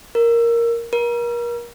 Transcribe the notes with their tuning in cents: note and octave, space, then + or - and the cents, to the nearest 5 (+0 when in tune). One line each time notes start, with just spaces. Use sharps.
A#4 +0
A#4 +35